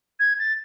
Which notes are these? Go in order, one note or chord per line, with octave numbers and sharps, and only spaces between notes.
G#6
A6